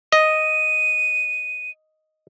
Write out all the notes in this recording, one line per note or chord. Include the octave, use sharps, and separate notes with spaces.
D#5 D#7